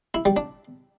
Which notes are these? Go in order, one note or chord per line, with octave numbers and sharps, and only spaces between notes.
E4
G3
D4